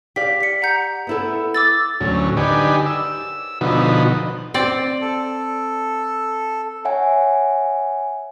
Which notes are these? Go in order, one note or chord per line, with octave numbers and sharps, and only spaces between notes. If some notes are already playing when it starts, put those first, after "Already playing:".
G4 D5 F5 B6
B6 C#7
F#5 A#5 G6
B3 E4 A4
D6 E6 A6
D2 A2 F#3 C#4
D3 D#4 G4 B4 D5 G#5
E6
B2 D3 F3 D#4 F#4 B4
C4 D5
A4
C#5 E5 F#5 G#5